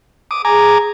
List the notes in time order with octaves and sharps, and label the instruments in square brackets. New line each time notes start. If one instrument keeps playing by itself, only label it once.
[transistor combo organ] D6 D#6
[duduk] G#4 [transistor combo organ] G#5 A#5 D6